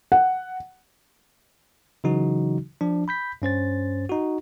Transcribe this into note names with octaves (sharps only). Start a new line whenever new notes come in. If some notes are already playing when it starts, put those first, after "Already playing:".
F#5
C#3 E3 F#3 D#4 F#4
F3 D4
B5 G6 B6
G2 C#4 C5 A6
D#4 F#4